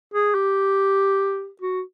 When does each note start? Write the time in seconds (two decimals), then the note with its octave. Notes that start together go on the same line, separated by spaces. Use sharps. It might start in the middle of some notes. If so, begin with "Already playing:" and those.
0.14 G#4
0.35 G4
1.62 F#4